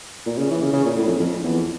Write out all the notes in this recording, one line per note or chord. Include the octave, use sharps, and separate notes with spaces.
A#2
C#3
E3
C#3
C#3
A#2
A2
F2
F2
E2